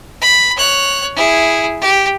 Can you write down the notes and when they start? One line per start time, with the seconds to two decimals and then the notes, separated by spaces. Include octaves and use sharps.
0.21 B5
0.56 C#5 F#6
1.16 E4 G#4
1.81 G4